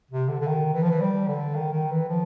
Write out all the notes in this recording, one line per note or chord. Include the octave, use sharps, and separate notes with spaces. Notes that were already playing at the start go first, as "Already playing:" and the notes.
C3
D3
D3
D#3
E3
F3
E3
G3
D3
D#3
D#3
E3
F3